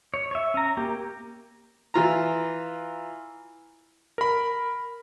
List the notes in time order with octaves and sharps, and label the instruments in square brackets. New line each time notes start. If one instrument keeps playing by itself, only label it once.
[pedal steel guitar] C#5
C#5 E5
C#4 A#5
A#3 G4
[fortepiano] E3 F4 A#5
[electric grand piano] A#4 B5